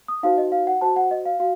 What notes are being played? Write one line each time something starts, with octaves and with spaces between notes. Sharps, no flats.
D#6
D#4 F#4 C5 F5
D#5
F5
F#5
F#4 C5 A5
F#5
D#5
F5
F#4 F5